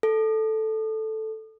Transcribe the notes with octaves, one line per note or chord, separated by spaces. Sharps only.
A4